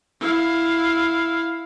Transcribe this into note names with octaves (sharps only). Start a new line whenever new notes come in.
E4 F5